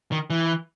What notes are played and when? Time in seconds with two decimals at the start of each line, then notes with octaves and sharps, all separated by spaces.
0.12 D#3
0.30 E3